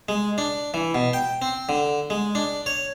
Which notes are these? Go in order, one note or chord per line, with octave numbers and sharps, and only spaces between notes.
G#3
D4
E3
B2
G5
C4
D3
G#3
D4
C#5